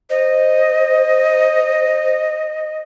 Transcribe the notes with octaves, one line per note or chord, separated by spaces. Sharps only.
C5 D#5